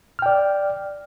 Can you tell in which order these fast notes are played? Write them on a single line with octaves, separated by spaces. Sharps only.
F6 G5 D5